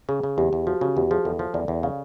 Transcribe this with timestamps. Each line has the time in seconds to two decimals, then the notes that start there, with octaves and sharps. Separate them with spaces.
0.09 C#3 G#4
0.23 C#3
0.38 E2 G4
0.53 E2
0.67 F3 F#4
0.81 C#3 F#4
0.96 E2 G4
1.11 F3 G#4
1.25 E2 A4
1.39 F3
1.54 E2 D5
1.68 E2
1.83 C#3 F5